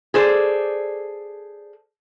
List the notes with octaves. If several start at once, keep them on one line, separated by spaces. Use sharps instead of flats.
G#4 A4 C5 D5